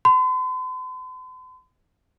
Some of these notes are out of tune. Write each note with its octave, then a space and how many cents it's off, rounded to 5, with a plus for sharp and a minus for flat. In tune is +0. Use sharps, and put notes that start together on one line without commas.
C6 -45